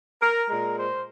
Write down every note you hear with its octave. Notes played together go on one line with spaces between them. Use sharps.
A#4
A#2 G#3 A#4
C5